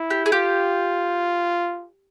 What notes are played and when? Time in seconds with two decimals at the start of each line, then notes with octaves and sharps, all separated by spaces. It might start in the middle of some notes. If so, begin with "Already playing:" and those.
Already playing: E4
0.10 G4
0.26 G#4
0.32 F4 G4